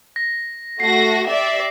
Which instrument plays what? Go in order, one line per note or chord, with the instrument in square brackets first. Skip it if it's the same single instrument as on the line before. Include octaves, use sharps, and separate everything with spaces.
[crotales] A#6
[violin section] A3 F#4 A#6 [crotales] C7
[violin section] G4 D5 E5